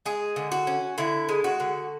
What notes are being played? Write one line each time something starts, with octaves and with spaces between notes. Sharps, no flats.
G#3 G#4
D3
F#4
C#4
D3 E4
G#3
F#4
D3